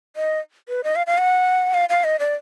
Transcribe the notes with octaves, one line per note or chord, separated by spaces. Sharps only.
D#5
B4
D#5
F5
F5
F#5
F5
F5
D#5
D5